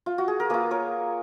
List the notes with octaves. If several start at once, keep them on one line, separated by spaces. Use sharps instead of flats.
F4
F#4
G#4
A#4
A#3 F4 G#4 B4
A#4 C#5